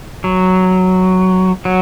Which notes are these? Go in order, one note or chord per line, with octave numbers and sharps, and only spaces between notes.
F#3
F#3